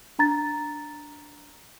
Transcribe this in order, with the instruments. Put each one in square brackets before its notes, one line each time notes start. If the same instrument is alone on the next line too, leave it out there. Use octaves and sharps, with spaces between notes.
[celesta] D4 A#5 A6